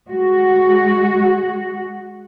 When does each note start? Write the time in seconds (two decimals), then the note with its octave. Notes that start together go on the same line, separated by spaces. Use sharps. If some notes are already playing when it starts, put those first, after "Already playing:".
0.10 G#3 F#4